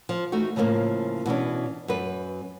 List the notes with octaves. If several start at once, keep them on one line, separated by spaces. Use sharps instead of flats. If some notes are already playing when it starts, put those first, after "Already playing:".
F3
E3 A3 D#4 F#4
A2 C#3 F3 G#3 A#3
B2 E3 C#4 D4
F#2 B4